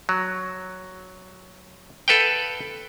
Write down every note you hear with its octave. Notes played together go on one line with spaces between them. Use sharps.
F#3
A4 B4 F5 G5